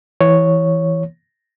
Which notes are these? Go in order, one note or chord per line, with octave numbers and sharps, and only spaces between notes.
E3 C#5